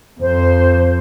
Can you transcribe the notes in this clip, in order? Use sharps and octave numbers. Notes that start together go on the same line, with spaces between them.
F2 C5